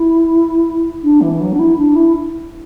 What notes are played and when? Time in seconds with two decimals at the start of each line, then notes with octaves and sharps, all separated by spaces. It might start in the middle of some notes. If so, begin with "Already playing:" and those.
Already playing: E4
1.03 D4
1.21 E3
1.41 F#3
1.52 D4
1.59 E4
1.77 D4
1.95 E4